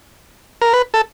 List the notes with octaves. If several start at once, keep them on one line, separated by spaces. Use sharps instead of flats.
A#4
B4
A4